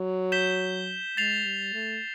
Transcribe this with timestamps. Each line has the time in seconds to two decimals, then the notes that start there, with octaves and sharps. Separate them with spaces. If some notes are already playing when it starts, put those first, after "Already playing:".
Already playing: F#3
0.32 G6 B6 E7 G7
1.17 G#3 A6 C7 F7
1.45 G3
1.73 A3